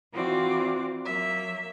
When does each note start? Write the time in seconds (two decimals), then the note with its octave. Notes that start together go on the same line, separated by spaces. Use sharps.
0.12 E3 C4 F4 F#4 D5 D6
1.05 F#3 A#3 E5